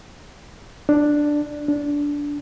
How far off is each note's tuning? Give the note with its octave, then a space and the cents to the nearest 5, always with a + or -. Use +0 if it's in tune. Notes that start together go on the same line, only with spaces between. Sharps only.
D4 +5
D4 -15